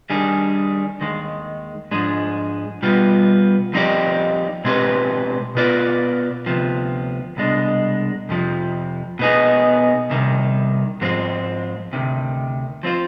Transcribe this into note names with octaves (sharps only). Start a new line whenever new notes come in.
D#3 G3 D4 G#4
D#2 D#3 G#3
G#2 F3 G#3 D4 G#4
B2 G3 B3 F4
F3 C4 D#4 G4 D5
B2 G#3 C4 G4 B4
B2 B3 F4 B4 D5
D2 C3 F3 B3
C2 B2 G#3 D4
F2 C3 F3
B2 B3 D#4 G#4
C2 C3 D#3
G#2 F3 G#3 C4
D2 C3 D#3
F3 C4 F4 C5